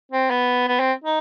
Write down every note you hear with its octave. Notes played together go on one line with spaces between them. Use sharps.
C4
B3
B3
C4
D#4